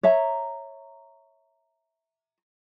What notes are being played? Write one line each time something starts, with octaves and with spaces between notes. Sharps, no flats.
C#5 E5 A#5